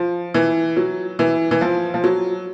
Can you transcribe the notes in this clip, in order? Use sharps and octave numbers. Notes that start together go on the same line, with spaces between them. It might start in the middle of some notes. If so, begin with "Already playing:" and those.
Already playing: F3
E3
F#3
E3
E3
F3
F3
F#3